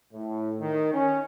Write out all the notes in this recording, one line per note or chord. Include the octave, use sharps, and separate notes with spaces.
A2
D#3
C#4